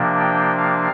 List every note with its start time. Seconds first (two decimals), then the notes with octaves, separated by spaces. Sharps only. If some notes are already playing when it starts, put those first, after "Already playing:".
Already playing: C3 F3 A#3 D4
0.18 G5
0.57 F5